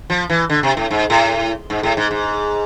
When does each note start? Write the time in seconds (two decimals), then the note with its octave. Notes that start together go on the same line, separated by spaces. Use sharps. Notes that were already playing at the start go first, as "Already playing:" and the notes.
0.10 F3
0.30 E3
0.50 D3
0.63 C3
0.77 A2
0.91 G#2
1.10 A2
1.70 G#2
1.83 A2
1.97 G#2
2.11 G#2